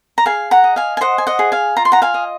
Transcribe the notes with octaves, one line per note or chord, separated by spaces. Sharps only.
A#5
G#4 F5 G#5
F#5 A#5
D#5
F5 G#5
G#5
C5 D#5 F#5
G#5
D#5 F#5
G#4
F5 G#5
F4 A#5
C6
F#5 A#5
F5 G#5
D#5